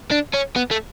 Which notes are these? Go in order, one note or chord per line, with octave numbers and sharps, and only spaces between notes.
D4
C#4
B3
A3